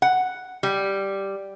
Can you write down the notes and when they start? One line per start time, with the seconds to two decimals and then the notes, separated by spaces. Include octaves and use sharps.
0.02 F#5
0.63 G3